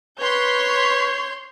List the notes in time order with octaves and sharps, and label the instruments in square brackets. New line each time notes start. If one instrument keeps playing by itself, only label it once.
[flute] B4 [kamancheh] C#5 [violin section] C6 G6